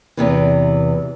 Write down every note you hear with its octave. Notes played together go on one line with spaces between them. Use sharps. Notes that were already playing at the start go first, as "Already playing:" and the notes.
E2 C3 E3